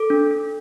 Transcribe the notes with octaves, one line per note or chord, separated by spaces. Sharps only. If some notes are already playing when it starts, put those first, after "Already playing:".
Already playing: A4 D6
D4
D4